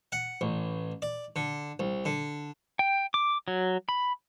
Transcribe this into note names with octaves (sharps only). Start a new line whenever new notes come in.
F#5
A1
D5
D3
C2
D3
G5
D6
F#3
B5